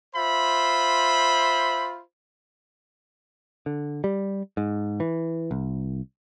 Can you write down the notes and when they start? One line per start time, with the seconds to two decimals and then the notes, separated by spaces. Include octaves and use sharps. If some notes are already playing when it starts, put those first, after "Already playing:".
0.15 F4 C5 E5 B5
3.66 D3
4.04 G3
4.57 G#2
5.00 E3
5.51 C2